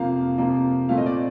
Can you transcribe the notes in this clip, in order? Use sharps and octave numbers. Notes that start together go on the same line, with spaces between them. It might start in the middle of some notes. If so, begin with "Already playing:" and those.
Already playing: F2 C3 F3 A#3 F5
F2 C3 F3 A#3
A#2 A3 C4 F5
D#5
D5